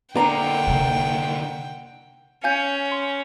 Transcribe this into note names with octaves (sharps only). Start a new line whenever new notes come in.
D3 A#3 D4 F#5 G5 A#5
C3 D#3
C#4 F5 G#5 G6
C6